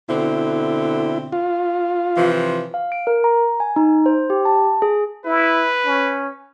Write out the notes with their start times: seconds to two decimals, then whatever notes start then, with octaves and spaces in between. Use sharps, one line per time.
0.09 B2 D3 C4 E4
1.32 F4
2.16 C3 E3 F3
2.74 F5
2.92 D7
3.07 A#4
3.24 A#5
3.60 G#5
3.76 D#4
4.06 C5
4.30 G4
4.45 A5
4.82 G#4
5.26 E4 B4
5.86 C#4